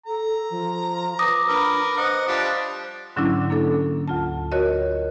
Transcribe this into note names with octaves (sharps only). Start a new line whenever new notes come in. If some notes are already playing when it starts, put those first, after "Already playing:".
A4 A#5
F3
B4 D6 D#6 A#6
D4 A#4 B4
C5 D#5 F#5
F3 G3 D4
G#2 D3 F#3 C#4 D4 E4
A#3 D4 A4
D2 F4 A5
F#4 A#4 C#5 D#5